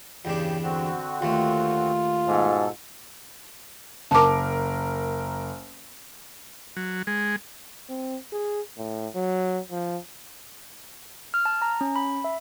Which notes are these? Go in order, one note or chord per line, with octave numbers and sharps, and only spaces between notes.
E2 G2 C#3 D4 G4
D3 C4 F#4
D#2 A3 F4
G#2 B2 A4
F#1 A#4 A5 D6
F#3
G#3
C4
G#4
A2
F#3
F3
F6
A5
A#5
C#4
B5
E5